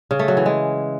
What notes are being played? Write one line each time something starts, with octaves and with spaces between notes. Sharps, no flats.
C#3
A3
F#3
E3
G#3